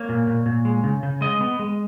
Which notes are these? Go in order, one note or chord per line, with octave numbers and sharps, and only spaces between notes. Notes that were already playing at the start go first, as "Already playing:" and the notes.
Already playing: A#3 C#5
A#2
A#2
A#2
G#3
C#3
C#3
G#3 D#5
B3
G#3